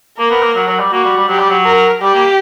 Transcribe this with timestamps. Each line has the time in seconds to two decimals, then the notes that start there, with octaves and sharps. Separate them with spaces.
0.19 A#3 A#4
0.30 B3
0.42 A#3
0.55 F#3
0.68 F#3
0.80 G3
0.92 A#3 F#4
1.05 G3
1.16 G3
1.28 F#3 G4
1.39 G3
1.50 F#3
1.65 A#4
2.02 G3 G4
2.14 A#3